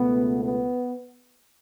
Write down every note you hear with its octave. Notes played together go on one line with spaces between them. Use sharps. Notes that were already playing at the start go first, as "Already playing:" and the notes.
Already playing: C#2 B2 A3 B3
B3